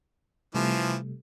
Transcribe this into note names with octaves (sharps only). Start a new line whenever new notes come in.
C3 E3 F3 G3 A3